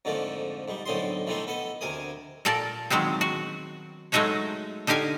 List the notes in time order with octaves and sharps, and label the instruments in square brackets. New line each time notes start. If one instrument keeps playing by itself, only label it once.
[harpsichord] F2 G#2 D3 F3 A3 A#3
G#2 G3
B1 A2 D3 C4 D#5 C6
E3 F3 A3 C4 D#4 F4
B3 A4 D#5
D2 C3 A#4 G#5 D#6
[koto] A#2 A4 A#4 D5 A5
D#3 F#3 G#3 B3 C4
F#4
F#3 G#3 A3 D#4 F#4 C#5
D3 D#4 G4 F5 G#5